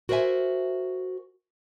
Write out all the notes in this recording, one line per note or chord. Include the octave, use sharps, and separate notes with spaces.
F#4 A#4 C5 D5 E5 G#5